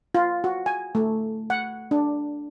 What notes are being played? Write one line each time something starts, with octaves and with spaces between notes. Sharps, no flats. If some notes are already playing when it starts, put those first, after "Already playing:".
F4
F#4
G#5
A3
F#5
D4